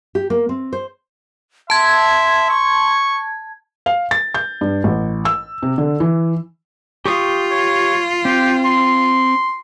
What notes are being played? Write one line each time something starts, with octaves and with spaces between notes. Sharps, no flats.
G4
A#3
C4
C5
E5 A5 C6 G#6
C#6
F5
A6
G6
G2
A1
E6
C3
D3
E3
F4 G4 C#6 D#6
C#5
C4 G4
C6